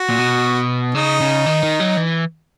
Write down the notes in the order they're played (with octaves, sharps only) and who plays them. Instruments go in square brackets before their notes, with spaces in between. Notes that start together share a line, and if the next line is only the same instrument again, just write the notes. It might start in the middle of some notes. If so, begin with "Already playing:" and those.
Already playing: [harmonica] F#4
[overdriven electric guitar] A#2
B2
[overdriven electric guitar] C#3 [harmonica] D#4
[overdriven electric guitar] C#3
D#3
D#3
F#3
E3